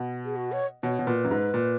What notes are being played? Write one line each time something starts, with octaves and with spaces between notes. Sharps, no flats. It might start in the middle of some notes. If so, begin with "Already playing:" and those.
Already playing: B2
G#4
F#4
C#5
B2 C#5
B2
A#2 B4
F#2
G#2
A#2